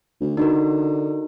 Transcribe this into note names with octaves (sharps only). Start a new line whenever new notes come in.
D2
D3 D#4 F#4 A#4